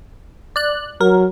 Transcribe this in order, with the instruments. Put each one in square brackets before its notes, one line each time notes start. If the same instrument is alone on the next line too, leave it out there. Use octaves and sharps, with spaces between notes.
[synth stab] D5 F#6
[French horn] F#3 [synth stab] A#4